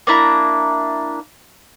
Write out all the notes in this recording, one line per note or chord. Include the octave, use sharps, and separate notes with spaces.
A#3 D4 E4 A#5